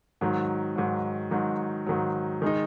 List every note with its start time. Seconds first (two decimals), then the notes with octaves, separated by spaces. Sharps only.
0.21 G#2 D#3 F#3
0.76 G#2 D#3 F#3
1.31 G#2 D#3 F#3
1.86 G#2 D#3 F#3
2.42 D#3 G#3 D#4